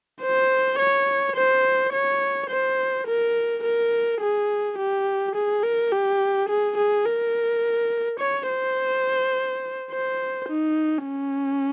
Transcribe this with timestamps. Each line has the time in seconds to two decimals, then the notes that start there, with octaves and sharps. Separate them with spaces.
0.22 C5
0.79 C#5
1.36 C5
1.93 C#5
2.50 C5
3.07 A#4
3.64 A#4
4.21 G#4
4.78 G4
5.35 G#4
5.63 A#4
5.92 G4
6.49 G#4
6.77 G#4
7.06 A#4
8.20 C#5
8.49 C5
9.91 C5
10.48 D#4
11.05 C#4